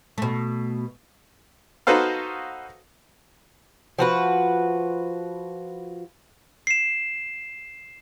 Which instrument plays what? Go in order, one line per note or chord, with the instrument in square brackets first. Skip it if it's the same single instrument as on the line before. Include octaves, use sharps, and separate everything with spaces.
[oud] B2 A3
[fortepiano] D#4 F#4 A4 B4 C5 F5
[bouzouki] F3 F#4 B4
[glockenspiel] C7 E7